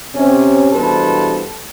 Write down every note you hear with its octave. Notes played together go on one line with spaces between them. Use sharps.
C3 C#4
E2 G2 B2 A4 B4 C5